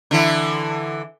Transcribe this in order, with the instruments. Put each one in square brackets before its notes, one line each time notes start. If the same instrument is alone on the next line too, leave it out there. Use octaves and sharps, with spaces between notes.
[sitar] D3 E3 E4